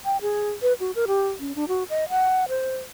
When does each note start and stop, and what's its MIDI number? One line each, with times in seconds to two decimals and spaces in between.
0.05 0.17 79
0.22 0.49 68
0.62 0.73 71
0.80 0.91 66
0.95 1.05 70
1.07 1.27 67
1.40 1.55 61
1.55 1.65 62
1.68 1.83 66
1.90 2.05 75
2.10 2.45 78
2.49 2.77 72